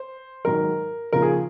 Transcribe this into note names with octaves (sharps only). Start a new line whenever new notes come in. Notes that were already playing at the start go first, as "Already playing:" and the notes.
Already playing: C5
G#2 D#3 F#3 A#4
D#2 C#3 F3 A#4
G#4